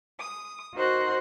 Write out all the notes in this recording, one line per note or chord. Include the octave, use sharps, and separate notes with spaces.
D#6
D#4 F#4 A#4 C5 F#5 C6